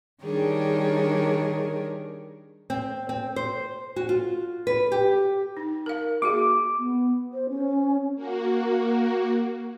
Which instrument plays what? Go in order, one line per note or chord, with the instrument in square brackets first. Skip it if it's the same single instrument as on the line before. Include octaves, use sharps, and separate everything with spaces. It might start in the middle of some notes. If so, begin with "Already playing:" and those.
[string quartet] D#3 G3 D4 G#4 A#4 C#5
[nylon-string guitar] C4
C4
C5
F#4
F4
B4
G4
[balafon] D#4
A#4 F5
[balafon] A#3 F#4 G#4 [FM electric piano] D6
[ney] B3
C5
C#4
[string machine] A#3 F#4